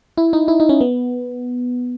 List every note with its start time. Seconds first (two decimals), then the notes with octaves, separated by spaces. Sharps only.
0.18 E4
0.33 D#4
0.48 E4
0.60 D#4
0.69 C#4
0.81 B3